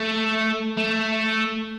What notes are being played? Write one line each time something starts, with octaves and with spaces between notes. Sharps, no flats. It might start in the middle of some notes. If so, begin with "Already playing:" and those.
Already playing: A3
A3